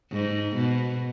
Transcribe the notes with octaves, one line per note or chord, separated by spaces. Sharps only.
G#2
B2